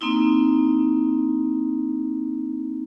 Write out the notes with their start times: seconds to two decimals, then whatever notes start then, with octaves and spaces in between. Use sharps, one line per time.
0.01 A#3 C4 D#4 E4